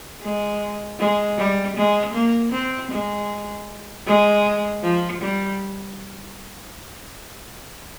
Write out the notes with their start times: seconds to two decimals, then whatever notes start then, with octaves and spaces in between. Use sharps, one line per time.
0.22 G#3
0.99 G#3
1.38 G3
1.77 G#3
2.14 A#3
2.52 C4
2.91 G#3
4.07 G#3
4.83 F3
5.22 G3